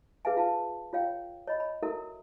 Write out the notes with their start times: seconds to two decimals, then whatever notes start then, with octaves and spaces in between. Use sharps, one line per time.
0.25 G#4 B4 E5 F5 G#5
0.37 F4 F5 A5
0.93 F4 C#5 F5 G5
1.48 C#5 D#5 B5
1.60 B5
1.83 E4 F#4 A4 A#4 E5